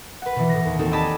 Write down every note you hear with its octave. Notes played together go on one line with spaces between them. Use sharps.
B4 F#5
B2 E3
A2 A#6
D#2
A#3 C4 D#4 F#4 A4
G4 D5 D#5 G#5 A5 B5